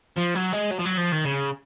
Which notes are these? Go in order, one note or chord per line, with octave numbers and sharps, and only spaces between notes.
F3
F#3
G#3
F#3
F3
F#3
F3
D#3
C#3